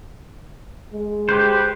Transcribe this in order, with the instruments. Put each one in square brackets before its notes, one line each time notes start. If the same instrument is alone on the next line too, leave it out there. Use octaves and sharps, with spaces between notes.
[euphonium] G#3
[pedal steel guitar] G4 B4 C5